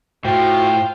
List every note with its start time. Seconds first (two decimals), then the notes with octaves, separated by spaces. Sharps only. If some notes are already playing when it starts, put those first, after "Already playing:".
0.25 A2 F4 F#4 C5 F5 G5